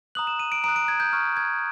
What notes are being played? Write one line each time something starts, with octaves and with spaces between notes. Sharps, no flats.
A#5 D#6 F#6 F#7
E7
D#7
D7
A#5 D#6 F#6 D7
D7
G#6
G6
C#6 F6
G#6